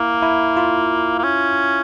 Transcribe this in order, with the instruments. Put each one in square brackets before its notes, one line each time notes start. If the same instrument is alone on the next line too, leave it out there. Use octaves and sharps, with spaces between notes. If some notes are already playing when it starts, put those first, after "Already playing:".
Already playing: [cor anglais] A#3 [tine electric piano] E4
[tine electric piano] E4
F4
[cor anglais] A#3
C#4